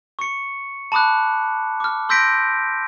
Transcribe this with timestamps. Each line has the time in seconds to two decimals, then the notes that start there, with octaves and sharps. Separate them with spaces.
0.19 C#6 C#7
0.92 A5 B5 D6 D#6 F#6
1.80 D6 F6
2.09 C6 E6 G6 A#6 B6 D7